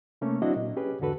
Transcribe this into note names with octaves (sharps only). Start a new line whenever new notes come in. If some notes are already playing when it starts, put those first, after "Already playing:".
C3 A3 A#3 C#4
F#3 C4 D4 E4 F#4 D#5
A#2
C#4 G4 G#4 B4
E2 G#2 D3 F#4 A4 B4